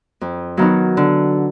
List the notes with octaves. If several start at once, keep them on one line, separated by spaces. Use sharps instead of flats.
F2
D#3 F#3 B3 D#4
D3